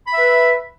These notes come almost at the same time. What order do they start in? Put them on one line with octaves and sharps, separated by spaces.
B5 E5 B4